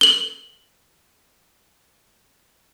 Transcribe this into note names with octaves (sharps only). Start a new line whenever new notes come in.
F#7 G7